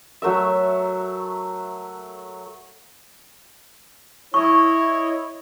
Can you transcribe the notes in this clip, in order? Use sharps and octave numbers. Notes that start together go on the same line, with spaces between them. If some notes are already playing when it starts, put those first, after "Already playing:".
F#3 A3 A#4 E5
E4 C#5 D#5 C#6